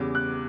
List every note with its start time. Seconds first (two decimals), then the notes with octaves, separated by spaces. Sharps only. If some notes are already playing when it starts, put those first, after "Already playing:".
Already playing: E2 C#3 G3 D6
0.15 F#6